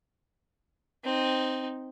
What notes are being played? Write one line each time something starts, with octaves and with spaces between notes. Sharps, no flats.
C4 D#4